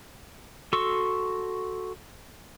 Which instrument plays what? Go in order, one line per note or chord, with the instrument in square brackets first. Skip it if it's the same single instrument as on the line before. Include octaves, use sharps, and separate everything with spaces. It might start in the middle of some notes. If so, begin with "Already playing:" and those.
[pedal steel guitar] F#4 A4 C6 C#6 E6